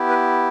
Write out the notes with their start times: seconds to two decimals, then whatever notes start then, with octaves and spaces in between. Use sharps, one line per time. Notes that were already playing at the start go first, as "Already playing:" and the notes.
Already playing: B3 E4 G4
0.09 B4